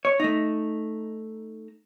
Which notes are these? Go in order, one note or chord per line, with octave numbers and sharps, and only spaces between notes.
C#5
A3 D#4